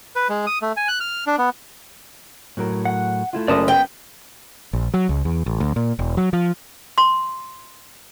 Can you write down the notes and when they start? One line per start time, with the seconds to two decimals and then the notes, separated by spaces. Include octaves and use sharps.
0.16 B4
0.29 G#3
0.47 D#6
0.62 A3
0.77 G#5
0.88 F#6
1.00 F6
1.27 D4
1.38 B3
2.57 A2 F#3 A#4
2.85 F#5
3.33 A3 E4 F4
3.48 F#1 D5 A5 D#6
3.68 B3 G5
4.73 A#1
4.94 F#3
5.09 C#2
5.25 E2
5.46 A1
5.60 D2
5.76 A#2
5.99 E1
6.17 F#3
6.33 F3
6.98 C6